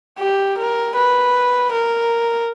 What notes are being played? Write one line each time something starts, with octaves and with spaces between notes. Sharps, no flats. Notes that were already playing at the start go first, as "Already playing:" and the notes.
G4
A#4
B4
A#4